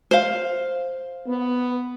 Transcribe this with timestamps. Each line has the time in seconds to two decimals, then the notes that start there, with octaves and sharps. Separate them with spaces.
0.11 C5 F5
1.27 B3